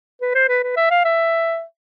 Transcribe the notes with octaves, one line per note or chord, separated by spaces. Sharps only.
B4
C5
B4
B4
E5
F5
E5